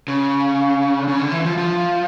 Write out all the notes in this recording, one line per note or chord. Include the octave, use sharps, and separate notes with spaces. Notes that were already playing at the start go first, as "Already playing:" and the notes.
C#3
C#3
D3
E3
F3
F3